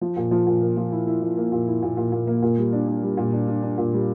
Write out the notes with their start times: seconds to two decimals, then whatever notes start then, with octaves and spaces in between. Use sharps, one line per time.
0.01 F3
0.17 A#2
0.31 F3
0.47 A#2
0.61 A#3
0.77 F3
0.92 E4
1.07 E4
1.22 F3
1.37 A#3
1.52 A#2
1.67 E4
1.82 A#2
1.97 A#2
2.12 A#2
2.27 A#3
2.43 A#2
2.58 G3
2.73 D4
2.88 D4
3.03 G3
3.17 A#2
3.33 D4
3.48 D4
3.63 D4
3.78 A#2
3.93 G3